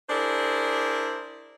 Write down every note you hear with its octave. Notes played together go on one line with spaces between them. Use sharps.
D4 E4 G#4 A#4 C5 D5